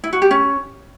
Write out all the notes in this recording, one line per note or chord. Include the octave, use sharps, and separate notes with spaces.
E4
F#4
G4
C#4